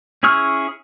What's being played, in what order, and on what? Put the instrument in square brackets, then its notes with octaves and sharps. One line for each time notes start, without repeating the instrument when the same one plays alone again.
[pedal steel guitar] C#4 E4 G#4 C#6 F6